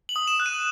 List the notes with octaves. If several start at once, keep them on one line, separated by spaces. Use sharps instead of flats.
F#7
D#6
E7
F#6
D#7